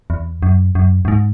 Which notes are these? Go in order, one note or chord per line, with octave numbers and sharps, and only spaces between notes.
E2
F#2
F#2
F#2
G#2